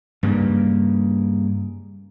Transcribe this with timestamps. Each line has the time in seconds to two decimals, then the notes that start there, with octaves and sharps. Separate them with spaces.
0.23 G2 C#3 A#3